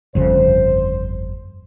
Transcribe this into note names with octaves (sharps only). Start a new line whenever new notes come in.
G1 F2 C#3 C5